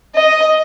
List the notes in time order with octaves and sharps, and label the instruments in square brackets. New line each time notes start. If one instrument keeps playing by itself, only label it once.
[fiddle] D#5